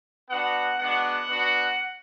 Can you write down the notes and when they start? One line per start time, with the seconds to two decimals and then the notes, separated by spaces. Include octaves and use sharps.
0.30 B3 D4 F#4 F#5
0.79 G#3 B3 D4 F#4 F#5
1.28 B3 D4 F#4